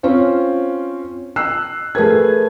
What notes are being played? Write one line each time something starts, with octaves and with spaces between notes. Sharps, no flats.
C4 C#4 F4 C5
E6 F#6 C7
A3 G#4 A#4 B4 G#6